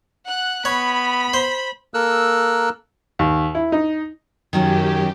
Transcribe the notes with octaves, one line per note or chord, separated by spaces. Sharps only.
F#5 F#6
B3 C#5 B5
C5
A#3 A4 A#4 E6 F#6
D#2
E4
D#4
F#2 D#3 F#3 C#4 G4